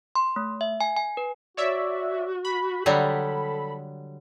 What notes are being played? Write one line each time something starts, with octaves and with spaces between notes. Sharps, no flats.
C6
A3
E5
G#5
G#5
B4
F#4 C#5 D5 E5
B5
D3 F#3 G3 A4